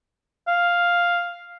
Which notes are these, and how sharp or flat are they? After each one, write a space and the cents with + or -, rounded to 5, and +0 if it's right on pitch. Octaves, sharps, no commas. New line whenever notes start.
F5 +0